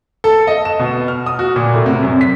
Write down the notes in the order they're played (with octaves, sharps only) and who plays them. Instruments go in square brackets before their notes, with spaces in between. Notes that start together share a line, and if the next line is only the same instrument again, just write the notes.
[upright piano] A4
D#5
E7
B2
F6
D#6
F#4
A#2
A2
C3
F#2
B6